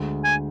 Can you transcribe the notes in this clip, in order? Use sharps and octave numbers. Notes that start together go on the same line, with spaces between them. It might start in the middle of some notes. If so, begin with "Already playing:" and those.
Already playing: D2 D3 G#3
G#5